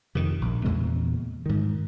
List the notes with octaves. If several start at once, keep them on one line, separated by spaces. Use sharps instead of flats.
F2 C3 D#3
A#1
E2 A#2 C#3 G#3
G#2 D#3